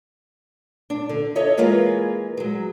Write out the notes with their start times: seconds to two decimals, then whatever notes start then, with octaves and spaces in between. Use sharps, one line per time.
0.90 D4
1.09 D3
1.35 A4 C#5 D#5 E5
1.57 E3 G#3 A#3 F4 G#4 B4
2.37 F#3 G#3